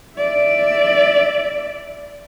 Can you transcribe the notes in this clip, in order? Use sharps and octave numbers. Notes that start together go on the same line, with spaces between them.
D5 E5